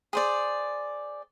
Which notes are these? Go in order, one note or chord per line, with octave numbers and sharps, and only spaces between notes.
G#4 C5 D5